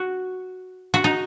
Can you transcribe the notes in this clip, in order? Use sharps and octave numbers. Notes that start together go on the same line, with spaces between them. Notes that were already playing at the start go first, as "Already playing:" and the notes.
Already playing: F#4
F#4
D#4